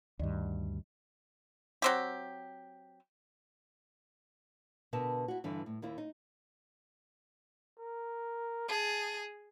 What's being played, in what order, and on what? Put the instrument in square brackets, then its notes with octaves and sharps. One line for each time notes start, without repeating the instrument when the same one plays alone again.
[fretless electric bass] D2 G2 [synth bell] D3 D#3
[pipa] F#3 C4 G4
[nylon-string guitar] B2 D3 A#4 B4 E5 A5
E4 F#4
G2 D3 E3
A2
D#2 A#3 E4
D#4
[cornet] A#4
[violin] G#4 [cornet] A5